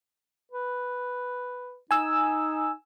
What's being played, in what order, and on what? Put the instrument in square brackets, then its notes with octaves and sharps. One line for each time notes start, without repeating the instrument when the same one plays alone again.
[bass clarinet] B4
[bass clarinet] D#4 [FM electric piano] G#5 E6